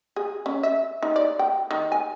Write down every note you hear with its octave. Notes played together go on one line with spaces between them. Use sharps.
G#4
C#4
E5
D#4
D5
G5
D#3
G#5